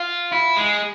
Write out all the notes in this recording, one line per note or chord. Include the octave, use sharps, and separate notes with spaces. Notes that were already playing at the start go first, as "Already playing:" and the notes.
Already playing: F4
E4
G#3